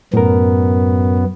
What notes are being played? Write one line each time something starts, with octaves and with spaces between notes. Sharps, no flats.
F#2 A2 B3 A#4